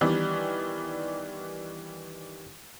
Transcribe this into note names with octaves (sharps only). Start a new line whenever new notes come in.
D#3 E3 G3 B3 D4